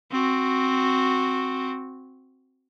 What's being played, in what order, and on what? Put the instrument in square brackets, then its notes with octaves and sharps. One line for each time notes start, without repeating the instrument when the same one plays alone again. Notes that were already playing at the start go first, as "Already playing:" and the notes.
[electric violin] C4 F#4